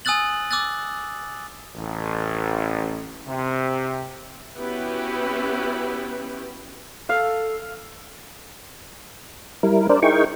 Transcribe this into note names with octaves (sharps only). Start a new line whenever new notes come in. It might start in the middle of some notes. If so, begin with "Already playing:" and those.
G#5 D#6 E6 F#6 A6 F#7
D6 E6 F#6 A6
A1
C3
B3 C#4 E4 F#4 G4 B4
A4 F5
G3 E4 A#4
D4 A#4 C5 D5
D#4 E4 G#4 A#4 G5 C#6